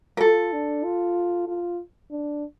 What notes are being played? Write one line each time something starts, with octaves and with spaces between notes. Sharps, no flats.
A#4
F4 A4
D4
F4
F4
D4